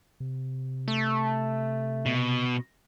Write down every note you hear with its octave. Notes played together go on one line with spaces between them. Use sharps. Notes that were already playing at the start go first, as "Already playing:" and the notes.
C3
A3
B2